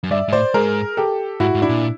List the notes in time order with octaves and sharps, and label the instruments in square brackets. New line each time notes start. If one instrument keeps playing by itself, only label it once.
[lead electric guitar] F#2
[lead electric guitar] G2 [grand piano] D5 E5
[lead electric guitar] G#2
[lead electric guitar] A2 [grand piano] C5 D5
[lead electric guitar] G#2 [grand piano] G#4 A#4
[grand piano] G4 A4
[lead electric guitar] G#2 [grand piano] E4 F#4
[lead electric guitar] G#2
[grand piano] D4 E4
[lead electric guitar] A#2